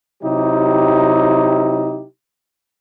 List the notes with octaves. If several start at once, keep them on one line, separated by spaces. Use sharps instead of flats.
C3 F#3 D#4 E4 G4